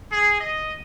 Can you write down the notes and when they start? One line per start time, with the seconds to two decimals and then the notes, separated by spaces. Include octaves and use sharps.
0.10 G#4
0.40 D#5